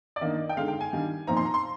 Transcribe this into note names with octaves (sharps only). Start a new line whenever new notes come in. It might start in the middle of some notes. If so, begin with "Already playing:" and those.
D5
D#3 A#3 D4 D#5
G5
D3 G#3 D#4 F5
G5
G#5
D#3 G3 D4
A#2 F3 C4 D#4 A#5
C6
A#5
C6